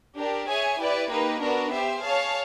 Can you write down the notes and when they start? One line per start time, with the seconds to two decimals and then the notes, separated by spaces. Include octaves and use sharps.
0.16 D4 G4 A#4
0.47 G#4 C#5 E5 G#5
0.80 E4 G4 B4 D5
1.10 A#3 D#4 G4 B4
1.42 B3 D4 F#4 A#4
1.72 G4 C5 E5
2.03 G#4 C#5 F5 A5